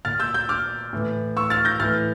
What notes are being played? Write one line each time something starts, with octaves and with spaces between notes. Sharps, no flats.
A#2 F6 A6
E6 G6
E6 G6
D6 F6
A2 E3
C#6 E6
F6 A6
G6 A#6
A2 E3 F6 A6